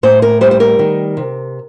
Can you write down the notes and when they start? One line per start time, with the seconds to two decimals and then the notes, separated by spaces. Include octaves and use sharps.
0.03 A2 C5
0.22 A#4
0.41 G3 C5
0.51 C5
0.60 A#4
0.79 D#3
1.17 C3